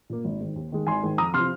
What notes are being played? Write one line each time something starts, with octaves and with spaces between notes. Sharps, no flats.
A#2 A#3
G#1
G#2 D#3
D#2
D#3 G#3
G#1 G#5 C6
G#2 D#3
F2 A#5 D#6
C3 F3 C6 F6